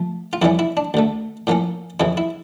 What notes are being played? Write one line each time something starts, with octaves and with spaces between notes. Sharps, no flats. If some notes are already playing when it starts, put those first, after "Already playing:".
Already playing: F3 A3
F4
F2 E3 G3 C#4 E4
E4
D4
D2 D3 A3
A2 F3 A#3 C#4
F2 C#3 E3 E4
E4